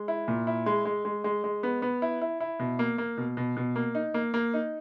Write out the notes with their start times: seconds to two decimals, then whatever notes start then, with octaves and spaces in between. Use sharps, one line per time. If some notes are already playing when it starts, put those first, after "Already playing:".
Already playing: G#3
0.08 E4
0.28 A#2
0.47 E4
0.66 G#3
0.85 G#3
1.05 G#3
1.24 G#3
1.44 G#3
1.63 B3
1.82 B3
2.02 E4
2.22 E4
2.41 E4
2.59 B2
2.79 A#3
2.98 A#3
3.17 B2
3.37 B2
3.57 B2
3.76 A#3
3.95 D#4
4.14 A#3
4.34 A#3
4.54 D#4